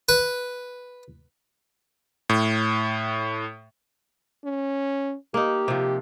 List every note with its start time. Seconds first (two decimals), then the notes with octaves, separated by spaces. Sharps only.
0.09 B4
2.29 A2
4.45 C#4
5.34 A#3 D#4 G4
5.68 C3 F3